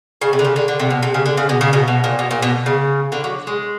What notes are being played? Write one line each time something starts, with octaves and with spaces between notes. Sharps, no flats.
C#3
C3
D3
C#3
D3
D3
C3
B2
C3
C#3
D3
C#3
B2
C#3
B2
B2
A#2
B2
A#2
B2
C#3
D3
F#3
G#3